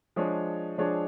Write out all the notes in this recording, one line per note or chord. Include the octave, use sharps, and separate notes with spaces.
F3 G#3 D4 G#4 C#5
F3 G#3 D4 G#4 C#5